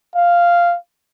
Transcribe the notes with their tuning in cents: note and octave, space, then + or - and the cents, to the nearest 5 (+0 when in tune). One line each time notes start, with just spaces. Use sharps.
F5 -5